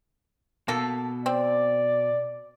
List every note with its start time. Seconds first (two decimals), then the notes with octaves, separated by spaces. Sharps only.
0.68 B2 A#3 A4
1.26 C4 D5